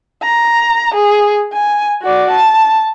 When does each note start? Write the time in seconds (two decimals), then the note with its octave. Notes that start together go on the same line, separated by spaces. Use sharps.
0.22 A#5
0.94 G#4
1.53 G#5
2.02 F#4 D5
2.31 A5